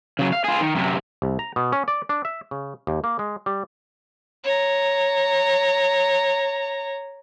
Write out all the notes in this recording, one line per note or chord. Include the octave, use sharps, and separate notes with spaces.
C#3 F#3
F5
F4 G#4
D#3
F#2 C3
C2
A#5
B2
C#4
D5
D4
E5
C#3
D#2
A#3
G#3
G3
C#5 A#5